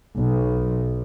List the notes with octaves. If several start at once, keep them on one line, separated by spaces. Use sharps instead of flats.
B1